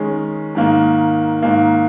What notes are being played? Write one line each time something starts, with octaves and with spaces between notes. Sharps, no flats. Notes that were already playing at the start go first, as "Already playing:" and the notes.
Already playing: D#3 G#3 C#4
G#2 D#3 A#3
G#2 D#3 A#3